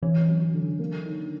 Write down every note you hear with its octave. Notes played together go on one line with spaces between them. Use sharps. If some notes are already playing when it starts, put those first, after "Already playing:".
E3 C#4
F#3
D3
A#3
D#3